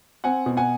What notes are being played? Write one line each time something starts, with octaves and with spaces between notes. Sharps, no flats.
C4 F#5 G#5
B2
F#5 G#5